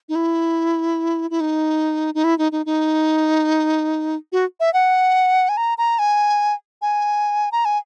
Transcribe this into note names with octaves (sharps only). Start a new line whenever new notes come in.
D#4
E4
E4
D#4
D#4
E4
D#4
D#4
D#4
F#4
E5
F#5
G#5
A#5
A#5
G#5
G#5
A#5
G#5